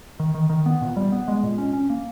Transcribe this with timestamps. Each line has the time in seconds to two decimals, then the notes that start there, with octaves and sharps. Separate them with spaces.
0.20 D#3
0.35 D#3
0.50 D#3
0.66 B3
0.81 A#2
0.97 G3
1.12 B3
1.28 G#3
1.43 A#2
1.58 C#4
1.73 C#4
1.90 A#3